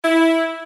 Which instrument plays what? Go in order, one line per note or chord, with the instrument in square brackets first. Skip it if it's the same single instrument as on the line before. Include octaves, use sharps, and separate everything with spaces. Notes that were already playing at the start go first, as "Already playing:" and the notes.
[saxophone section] E4